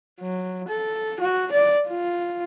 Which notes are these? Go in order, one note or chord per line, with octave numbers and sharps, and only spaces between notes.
F#3
A4
F#4
D5
F4